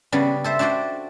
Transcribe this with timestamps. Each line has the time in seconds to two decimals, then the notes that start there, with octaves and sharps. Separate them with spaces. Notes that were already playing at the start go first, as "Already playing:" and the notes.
0.12 C#3 G3 B3 D4
0.44 A4 C5 E5
0.59 D4 F#4 C5 D5 G5